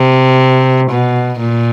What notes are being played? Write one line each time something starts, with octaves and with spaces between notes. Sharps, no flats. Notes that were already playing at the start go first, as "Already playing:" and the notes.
Already playing: C3
B2
A#2